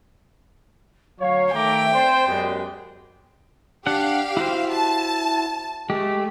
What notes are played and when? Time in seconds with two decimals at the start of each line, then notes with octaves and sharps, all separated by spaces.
1.20 D2 F#3 C#5 F5
1.53 D#3 A3 E5 G5 A#5 D6
1.93 C4 C5 D5
2.27 F#2 G#3 B3 G4
3.87 D4 G4 F5 F#5
4.37 E4 F#4 C5
4.71 A5
5.90 G#3 A3 G4